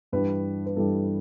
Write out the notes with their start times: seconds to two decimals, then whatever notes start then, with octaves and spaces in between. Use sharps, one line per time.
0.12 G2 E3 G3 D4 B4
0.66 B4
0.76 G2 E3 G3 D4 A4